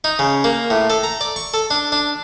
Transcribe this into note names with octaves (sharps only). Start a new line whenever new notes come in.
D#4
C#3
A#3
A2
A4
A#5
D5
C#6
A4
D4
D4